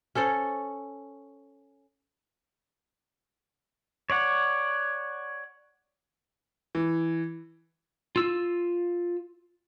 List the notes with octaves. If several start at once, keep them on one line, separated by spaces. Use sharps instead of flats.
C#4 A4 C5 C#5
C#5 D5 F#5
E3
F4 E6